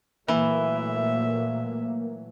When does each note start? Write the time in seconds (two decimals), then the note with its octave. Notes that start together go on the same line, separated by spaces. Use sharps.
0.28 A#2 E3 F#3 A3 A#3 E5